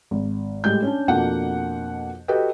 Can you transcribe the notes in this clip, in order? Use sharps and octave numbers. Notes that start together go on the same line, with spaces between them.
G#1
A2 G3 G#3 G6
C#4 D4
F2 B2 A#3 D4 F#5
F#4 G4 A4 B4 D#5 G5